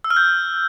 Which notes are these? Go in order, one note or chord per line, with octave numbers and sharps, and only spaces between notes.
E6
F6
G6